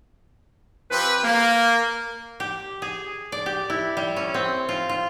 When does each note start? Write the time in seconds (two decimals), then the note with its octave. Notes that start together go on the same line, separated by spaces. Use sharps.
0.91 F3 C4 G4 B4
1.23 A#3
2.40 G4
2.82 G#4
3.32 D5
3.46 G4
3.70 E4
3.97 G3
4.16 C#4
4.34 C4
4.69 F4
4.89 F4